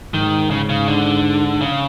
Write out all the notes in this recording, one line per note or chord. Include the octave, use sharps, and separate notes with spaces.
G#2 D#3
C#3
C#3
D3
C#3